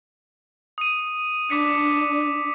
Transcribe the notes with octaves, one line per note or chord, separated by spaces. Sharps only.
D#6 D#7
D4 D6 B6 C#7